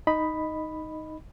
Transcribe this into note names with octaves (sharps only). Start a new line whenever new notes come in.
D#4 D#5 B5